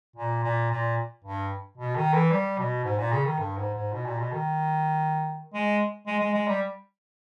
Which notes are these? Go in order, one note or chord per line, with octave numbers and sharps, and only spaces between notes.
A#2
A#2
A#2
G2
B2
D#3
E3
G3
B2
G#2
A#2
C#3
D#3
G2
G#2
G#2
B2
A#2
B2
D#3
G#3
G#3
G#3
G#3
G3